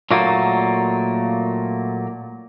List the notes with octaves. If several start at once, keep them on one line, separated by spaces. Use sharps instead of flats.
A#2 F#3 A3 A#3